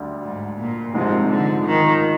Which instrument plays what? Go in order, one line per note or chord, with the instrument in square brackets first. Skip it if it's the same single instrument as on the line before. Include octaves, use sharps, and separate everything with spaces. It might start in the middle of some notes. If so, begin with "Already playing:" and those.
Already playing: [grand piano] D2 D3 G3
[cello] G#2
A#2
[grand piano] G#1 G#2 F3 G#3 [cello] C3
[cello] D3
D#3